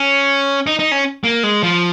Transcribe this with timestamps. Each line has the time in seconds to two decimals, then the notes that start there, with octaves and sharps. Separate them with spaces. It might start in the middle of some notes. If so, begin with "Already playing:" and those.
Already playing: C#4
0.67 D#4
0.79 D#4
0.92 C#4
1.24 A#3
1.43 G#3
1.63 F3